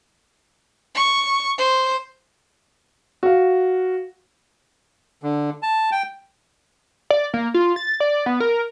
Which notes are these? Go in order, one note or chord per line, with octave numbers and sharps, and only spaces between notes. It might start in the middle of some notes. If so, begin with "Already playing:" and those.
C#6
C5
F#4 F5
D3
A5
G5
D5
A#3
F4
A6
D5
B3
A#4